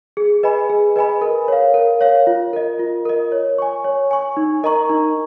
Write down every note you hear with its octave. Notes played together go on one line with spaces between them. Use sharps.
G#4
B4 D#5 G#5 B5
G#4
B4 D#5 G#5 B5
A#4
C#5 F5
A#4
C#5 F5
F4
A#4 D#5
F4
A#4 D#5
C#5
G#5 C#6
C#5
G#5 C#6
D#4
A#4 D#5 A#5 C#6
D#4